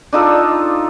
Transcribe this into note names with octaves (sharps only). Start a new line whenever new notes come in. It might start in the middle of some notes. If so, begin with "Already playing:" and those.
D4 D#4 F4 A4